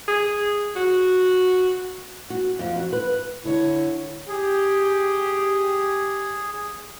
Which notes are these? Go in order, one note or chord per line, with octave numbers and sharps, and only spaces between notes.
G#4
F#4
F#4
F2
F#4
B4
D3 E4 C#5
G4 G#4